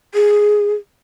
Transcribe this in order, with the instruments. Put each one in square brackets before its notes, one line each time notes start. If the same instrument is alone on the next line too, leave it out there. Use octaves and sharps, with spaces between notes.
[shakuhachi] G#4